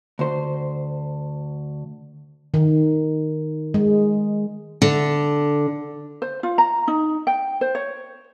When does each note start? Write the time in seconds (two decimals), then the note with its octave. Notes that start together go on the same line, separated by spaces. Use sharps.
0.19 D2 C5
2.54 D#3
3.74 G#3
4.82 D3
6.22 C5
6.43 F4
6.58 A#5
6.88 D#4
7.27 G5
7.61 C5
7.75 C#5